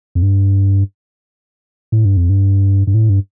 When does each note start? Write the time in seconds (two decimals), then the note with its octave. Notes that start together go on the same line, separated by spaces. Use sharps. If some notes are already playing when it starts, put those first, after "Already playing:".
0.15 F2
0.22 G2
1.92 A2
2.05 G2
2.17 F2
2.29 G2
2.87 G2
2.94 A2
3.09 G2